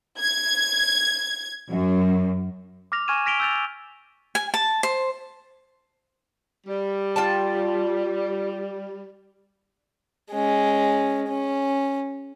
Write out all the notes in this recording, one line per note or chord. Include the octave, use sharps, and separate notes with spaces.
G#6
F#2
D6 F6 A#6 F7
G#5 C#6 F6 G#6 D#7 E7
F6 A#6 B6 D7 F7 G7
E6 G6 A6 F7
G#5
A5
C5
G3
F4 G5 A5
G#3 C#4
C#4